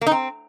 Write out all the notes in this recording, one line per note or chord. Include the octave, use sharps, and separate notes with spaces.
A#3
D#4
C4